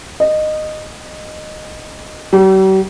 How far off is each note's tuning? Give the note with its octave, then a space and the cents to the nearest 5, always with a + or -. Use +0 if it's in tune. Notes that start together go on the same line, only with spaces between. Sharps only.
D#5 -15
G3 -45